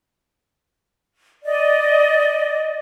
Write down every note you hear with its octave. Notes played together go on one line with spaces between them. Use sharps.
D5 D#5